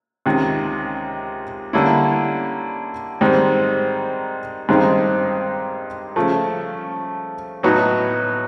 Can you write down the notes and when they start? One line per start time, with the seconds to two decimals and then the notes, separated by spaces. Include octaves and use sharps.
0.26 C#2 C3 D#3
1.73 D3 G3 A#3 C#4 E4
3.21 G#2 D#3 G3 C4
4.69 G2 D#3 G#3 C4 D#4
6.16 C#3 F3 A3
7.63 A2 F#3 B3 D#4 F#4